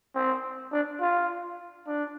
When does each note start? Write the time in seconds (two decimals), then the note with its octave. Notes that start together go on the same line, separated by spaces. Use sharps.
0.15 C4
0.72 D4
1.01 F4
1.87 D4